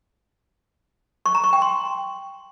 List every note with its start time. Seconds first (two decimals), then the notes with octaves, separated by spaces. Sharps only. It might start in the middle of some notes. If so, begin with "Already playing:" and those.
1.26 C#6
1.35 A#5
1.44 C#6
1.53 G5
1.62 C6